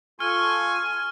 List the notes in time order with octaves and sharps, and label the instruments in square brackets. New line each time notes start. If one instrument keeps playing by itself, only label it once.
[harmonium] F4 A4 [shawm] G#5 [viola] C#6 [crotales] F6